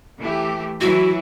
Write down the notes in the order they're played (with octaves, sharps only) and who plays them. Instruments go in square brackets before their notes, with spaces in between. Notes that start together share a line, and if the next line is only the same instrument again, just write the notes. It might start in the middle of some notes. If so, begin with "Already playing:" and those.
[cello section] E3 A3 G4
[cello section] E3 F#3 E4 [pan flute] F#4